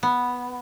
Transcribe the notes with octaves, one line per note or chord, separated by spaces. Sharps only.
B3